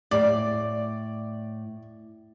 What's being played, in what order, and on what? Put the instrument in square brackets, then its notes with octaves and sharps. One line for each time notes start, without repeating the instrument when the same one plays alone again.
[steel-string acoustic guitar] A2 [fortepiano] D5